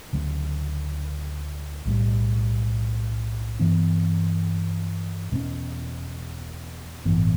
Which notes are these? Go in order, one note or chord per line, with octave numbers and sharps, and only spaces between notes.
D2 C#3 F#3 A3
B1 A2 G3
G2 E3 B3 D4
E2 B2 A3 C#4
A1 G2 E3 B3